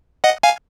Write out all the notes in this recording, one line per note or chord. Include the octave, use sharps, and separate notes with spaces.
D#5 F#5
F5 G#5